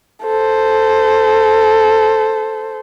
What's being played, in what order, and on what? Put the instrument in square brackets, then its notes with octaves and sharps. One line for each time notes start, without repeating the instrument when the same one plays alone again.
[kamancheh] A4 C5